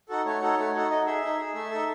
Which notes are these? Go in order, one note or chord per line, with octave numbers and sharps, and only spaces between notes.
D#4 F#4 A4
A3 C#5
D#4 F#4 A4
A3
D#4 F#4 A4
D#4 D#5
G#4 E5
D#4
G#4
A3 E5
D#4 A4